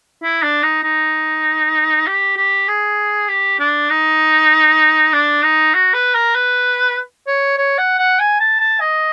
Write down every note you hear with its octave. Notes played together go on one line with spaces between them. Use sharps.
E4
D4
D#4
D#4
G4
G4
G#4
G4
D4
D#4
D4
D#4
F#4
B4
A#4
B4
C#5
C#5
F#5
F#5
G#5
A5
A5
D#5